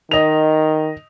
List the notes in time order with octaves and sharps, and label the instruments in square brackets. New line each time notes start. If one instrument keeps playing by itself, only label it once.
[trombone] D#3 [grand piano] D#5 F7